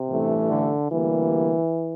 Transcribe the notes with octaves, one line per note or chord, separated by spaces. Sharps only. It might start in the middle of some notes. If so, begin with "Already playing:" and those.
Already playing: C3
A1 G2 E3 A3
D3
D2 C3 E3 G3 A#3